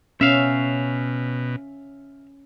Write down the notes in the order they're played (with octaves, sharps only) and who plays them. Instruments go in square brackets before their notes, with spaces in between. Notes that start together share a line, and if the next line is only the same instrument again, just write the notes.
[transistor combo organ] B2 [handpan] C#4 [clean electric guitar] E5 F5